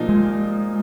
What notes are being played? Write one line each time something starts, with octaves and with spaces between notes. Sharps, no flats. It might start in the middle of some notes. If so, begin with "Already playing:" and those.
Already playing: A#2 F3 A#3 D#4
G#3